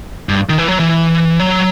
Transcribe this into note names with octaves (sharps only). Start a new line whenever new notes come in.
G2
D#3
E3
F#3
E3
F#3